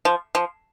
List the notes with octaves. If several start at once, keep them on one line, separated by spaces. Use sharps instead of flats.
F3
F3